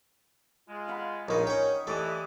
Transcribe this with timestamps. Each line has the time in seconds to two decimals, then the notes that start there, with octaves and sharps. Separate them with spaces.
0.69 G#3 F4
0.88 F5 F#5 B5
1.29 A#1 A#3 D#4 B4 C#5 D#5
1.47 C#4 G5
1.87 E3 A3 G4 D5 D#5